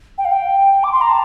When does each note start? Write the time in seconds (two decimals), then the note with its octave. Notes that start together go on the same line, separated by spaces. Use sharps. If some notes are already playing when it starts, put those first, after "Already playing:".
0.18 G5
0.25 F5
0.32 G5
0.83 D6
0.92 C6
1.01 A#5
1.09 A5